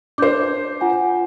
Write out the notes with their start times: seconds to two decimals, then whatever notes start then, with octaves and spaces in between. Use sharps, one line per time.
0.18 D4 C5 D6 G6
0.81 F4 F#5 G#5